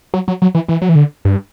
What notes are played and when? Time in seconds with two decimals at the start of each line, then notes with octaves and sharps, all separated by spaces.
0.14 F#3
0.28 F#3
0.42 F#3
0.55 E3
0.69 E3
0.82 F#3
0.89 E3
0.95 D3
1.25 G2